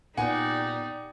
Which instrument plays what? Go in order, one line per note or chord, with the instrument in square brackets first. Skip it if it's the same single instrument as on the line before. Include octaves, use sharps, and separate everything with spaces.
[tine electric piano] A#2 B3 [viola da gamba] D#4 G4 D5 [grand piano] F#5 G#5